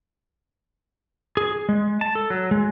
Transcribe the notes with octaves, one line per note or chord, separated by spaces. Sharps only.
G#4
G#3
A5
A4
F#3
G#3